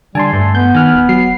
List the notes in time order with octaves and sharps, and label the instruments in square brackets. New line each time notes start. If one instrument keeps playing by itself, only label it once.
[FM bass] D3 [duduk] G3 [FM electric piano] G#5 A5 C6
[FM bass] G2 [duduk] A3
[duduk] B3 [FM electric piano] G6
[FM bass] D#3 [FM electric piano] G#5 F6 F#6
[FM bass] D#1
[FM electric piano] F#3 C7